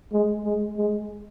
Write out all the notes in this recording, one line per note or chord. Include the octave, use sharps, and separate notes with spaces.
G#3
G#3
G#3